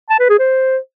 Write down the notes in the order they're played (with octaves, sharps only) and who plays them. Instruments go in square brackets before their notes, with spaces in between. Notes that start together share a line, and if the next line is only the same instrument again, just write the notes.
[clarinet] A5
B4
G#4
C5